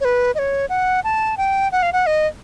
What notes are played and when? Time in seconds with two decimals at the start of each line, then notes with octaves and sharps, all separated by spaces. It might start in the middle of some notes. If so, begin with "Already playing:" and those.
0.01 C#5
0.05 B4
0.35 D#5
0.39 C#5
0.69 F#5
1.04 A5
1.37 G5
1.72 F#5
1.83 F5
1.93 F#5
2.07 D#5